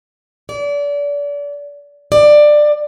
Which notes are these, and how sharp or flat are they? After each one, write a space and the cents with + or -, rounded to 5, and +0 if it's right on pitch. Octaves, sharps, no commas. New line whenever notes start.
D5 -30
D5 +15